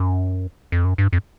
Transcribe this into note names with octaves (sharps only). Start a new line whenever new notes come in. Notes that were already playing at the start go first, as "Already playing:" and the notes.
Already playing: F#2
F2
F#2
G2
F2